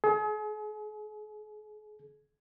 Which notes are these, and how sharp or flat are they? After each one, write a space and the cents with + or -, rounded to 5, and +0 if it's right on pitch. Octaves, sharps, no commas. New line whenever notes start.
G#4 +40